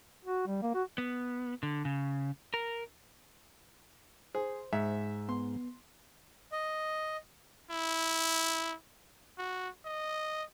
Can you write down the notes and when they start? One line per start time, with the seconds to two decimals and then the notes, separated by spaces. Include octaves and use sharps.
0.25 F#4
0.47 G3
0.62 A#3
0.75 F#4
0.98 B3
1.63 D3
1.85 C#3
2.54 A#4
4.35 G#4 C5
4.73 G#2 E5
5.29 B3 C6
6.52 D#5
7.71 E4
9.38 F#4
9.85 D#5